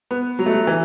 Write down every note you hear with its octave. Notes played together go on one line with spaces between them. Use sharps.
B3
F#3
A3
F#3
E3